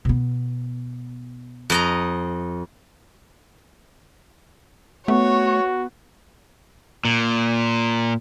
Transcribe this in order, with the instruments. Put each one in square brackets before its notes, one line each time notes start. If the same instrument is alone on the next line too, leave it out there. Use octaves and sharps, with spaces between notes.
[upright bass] B2 B3
[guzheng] F2 D#5 A#5
[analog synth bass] A3 [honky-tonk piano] B3 [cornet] F#4 [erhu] C#5
[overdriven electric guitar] A#2